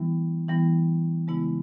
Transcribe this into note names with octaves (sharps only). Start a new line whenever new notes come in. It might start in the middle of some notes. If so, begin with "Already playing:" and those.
Already playing: E3 G3 B3 E4
E3 G3 B3 E4
C#3 G#3 B3 E4